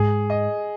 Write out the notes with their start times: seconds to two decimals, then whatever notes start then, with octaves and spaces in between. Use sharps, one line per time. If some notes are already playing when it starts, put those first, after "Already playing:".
Already playing: G#2 G#4
0.30 D#5